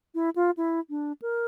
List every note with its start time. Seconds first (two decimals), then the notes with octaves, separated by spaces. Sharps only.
0.15 E4
0.36 F4
0.57 E4
0.90 D4
1.22 A#4